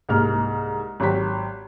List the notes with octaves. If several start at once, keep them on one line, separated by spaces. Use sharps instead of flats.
C2 G#2 A#3 F6
G#1 F#3 G4 B6